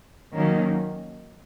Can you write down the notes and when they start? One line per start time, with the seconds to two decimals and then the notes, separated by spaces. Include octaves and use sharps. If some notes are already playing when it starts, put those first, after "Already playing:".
0.34 D#3 F#3 A#3 C#4